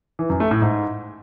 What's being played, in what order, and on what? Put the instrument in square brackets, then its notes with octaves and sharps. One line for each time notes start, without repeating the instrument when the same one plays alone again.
[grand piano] E3
F#2
A3
A2
G#2